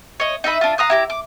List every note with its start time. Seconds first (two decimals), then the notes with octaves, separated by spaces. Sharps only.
0.20 C#5 D#5
0.44 D#4 D#5 E5 B5
0.61 D4 F4
0.78 F5 A#5 D#6 F#6
0.90 E4 G4 A#5
1.10 D6